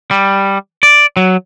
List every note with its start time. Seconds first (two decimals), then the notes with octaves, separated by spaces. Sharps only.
0.11 G3
0.83 D5
1.17 F#3